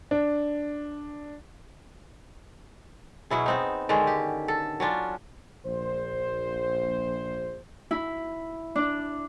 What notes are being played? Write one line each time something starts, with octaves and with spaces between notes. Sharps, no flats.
D4
B2 F#3 E4 G#4
B3 C4 D#4
D3 D#3 G#3 C#4
G4
A4
F#3 C#4 D4 F4
A#1 C5
E4
D4